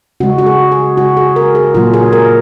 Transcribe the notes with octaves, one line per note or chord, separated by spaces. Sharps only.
C#3 G#3 F#4
F#4
G#4
G#4
C#3 G#3 F#4
G#4
A#4
G#4
A#2 F#3 A#3 F4
G#4
A#4